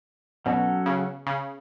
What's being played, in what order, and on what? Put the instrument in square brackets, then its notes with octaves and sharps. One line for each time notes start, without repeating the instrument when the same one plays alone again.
[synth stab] B2 [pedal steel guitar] F#3 C#4 F#4 A4
[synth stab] C#3
C#3